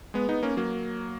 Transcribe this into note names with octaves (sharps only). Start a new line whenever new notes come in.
G#3 B3
B3 D#4
A#3 C#4
F#3 A#3